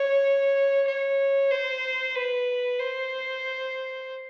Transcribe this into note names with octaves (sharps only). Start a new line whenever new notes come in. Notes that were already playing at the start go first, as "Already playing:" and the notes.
Already playing: C#5
C#5
C5
B4
C5